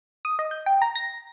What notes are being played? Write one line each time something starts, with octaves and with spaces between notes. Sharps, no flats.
D#6
D#5
G6
G5
A#5
A#6